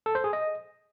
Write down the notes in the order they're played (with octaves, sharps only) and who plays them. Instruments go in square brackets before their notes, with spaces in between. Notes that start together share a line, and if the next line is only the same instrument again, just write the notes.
[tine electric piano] A4
C5
G#4
D#5